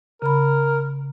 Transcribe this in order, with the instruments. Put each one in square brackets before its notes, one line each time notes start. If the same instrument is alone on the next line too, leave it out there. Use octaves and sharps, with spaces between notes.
[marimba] C#3 B5 [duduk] A#4